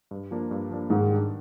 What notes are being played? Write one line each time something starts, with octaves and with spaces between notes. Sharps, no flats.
G2
F3 A#3 D4
G2
F3 A#3 D4
G#2 D#3
G3 D4